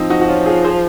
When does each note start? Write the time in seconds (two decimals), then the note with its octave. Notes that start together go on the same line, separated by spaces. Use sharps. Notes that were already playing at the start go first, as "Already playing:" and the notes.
Already playing: F3 C4 D#4
0.10 D#4 F#4
0.22 F#4
0.28 C#4 F4
0.46 F4 G#4
0.64 G#4 C5